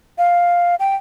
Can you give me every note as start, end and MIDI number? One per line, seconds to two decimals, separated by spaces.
0.18 0.75 77
0.79 0.95 79